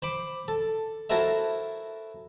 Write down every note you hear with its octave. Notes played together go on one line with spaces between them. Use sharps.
C5 B5 D6
A4
E4 F#4 A4 A#4 C5 E5